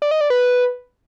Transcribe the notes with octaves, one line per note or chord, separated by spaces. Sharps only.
D5
D#5
D5
B4